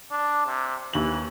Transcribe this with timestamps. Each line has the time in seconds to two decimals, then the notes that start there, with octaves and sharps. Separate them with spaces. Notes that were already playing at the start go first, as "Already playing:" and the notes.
0.11 D4
0.47 C3
0.93 D#2 E3 F#7